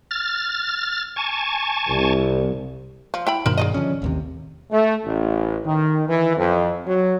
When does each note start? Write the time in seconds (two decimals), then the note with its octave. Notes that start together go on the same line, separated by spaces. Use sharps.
0.11 F6 A6
1.16 G#5 A5 C#6
1.88 C2
3.14 F3
3.27 E4 G5 B5
3.46 G2 B2 D#3 A#4 C5 B5
3.58 G#4 D5 D#5
3.74 D3 F3 C#4
4.02 A1 D#2 C3
4.71 A3
5.03 A1
5.64 D#3
6.07 E3
6.37 F2
6.85 F#3